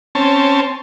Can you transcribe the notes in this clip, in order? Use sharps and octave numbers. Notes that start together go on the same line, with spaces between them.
C4 C#4 A5